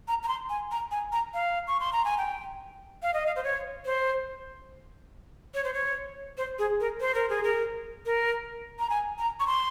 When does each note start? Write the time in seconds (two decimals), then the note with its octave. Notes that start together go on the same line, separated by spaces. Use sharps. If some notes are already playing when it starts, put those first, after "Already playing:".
0.08 A#5
0.23 A#5
0.28 C6
0.49 G#5
0.71 A#5
0.91 G#5
1.12 A#5
1.34 F5
1.68 C#6
1.80 C6
1.93 A#5
2.05 G#5
2.18 G5
3.03 F5
3.14 D#5
3.26 F5
3.36 C5
3.44 C#5
3.85 C5
5.54 C#5
5.64 C5
5.74 C#5
6.38 C5
6.59 G#4
6.80 A#4
7.01 C5
7.15 A#4
7.30 G#4
7.43 A#4
8.06 A#4
8.79 A#5
8.90 G#5
9.19 A#5
9.40 C#6
9.47 C6